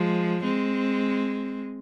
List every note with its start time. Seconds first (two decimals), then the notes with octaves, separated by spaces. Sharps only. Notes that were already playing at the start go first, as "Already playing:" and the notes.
Already playing: F3 G#3
0.44 G#3 C4